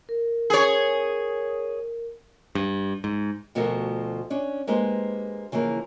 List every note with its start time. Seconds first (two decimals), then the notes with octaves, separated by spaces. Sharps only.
0.09 A#4
0.50 G#4 C#5
2.55 G2
3.04 G#2
3.55 D2 B2 F3 A3 F#4 A#4
4.30 C#4 D4
4.67 G#3 A#3 G4 B4 C5
5.52 C#3 E3 F3 A#3